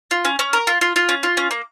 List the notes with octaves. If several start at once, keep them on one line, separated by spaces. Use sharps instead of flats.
F4
C#4
C#4
A#4
F4
F4
F4
C#4
F4
C#4
A#3